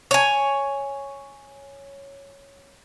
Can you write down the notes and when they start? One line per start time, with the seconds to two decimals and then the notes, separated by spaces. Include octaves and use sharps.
0.11 C#5 G#5